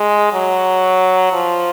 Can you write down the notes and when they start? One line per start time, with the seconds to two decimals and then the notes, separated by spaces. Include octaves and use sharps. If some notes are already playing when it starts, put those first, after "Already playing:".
Already playing: G#3
0.33 F#3
1.33 F3